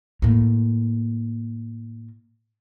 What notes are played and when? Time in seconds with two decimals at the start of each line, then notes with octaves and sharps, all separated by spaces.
0.22 A2 A#3